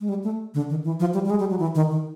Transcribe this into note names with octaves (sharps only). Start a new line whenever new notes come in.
G#3
G3
A3
D3
D#3
E3
F3
G3
G3
G#3
G3
F#3
E3
D#3
D#3